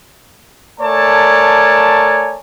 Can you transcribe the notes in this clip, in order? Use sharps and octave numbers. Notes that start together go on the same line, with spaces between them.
A3 A#4 C#5 D5 G#5 A5